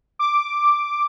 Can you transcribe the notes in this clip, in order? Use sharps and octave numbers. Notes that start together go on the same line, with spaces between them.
D6